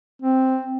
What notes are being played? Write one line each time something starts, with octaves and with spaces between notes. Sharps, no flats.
C4